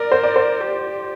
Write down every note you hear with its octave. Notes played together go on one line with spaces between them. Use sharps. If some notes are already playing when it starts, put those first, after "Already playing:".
Already playing: A#4 D5
C5
D5
C5
G4